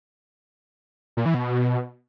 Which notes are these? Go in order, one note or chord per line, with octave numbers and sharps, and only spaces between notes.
A#2
E3
B2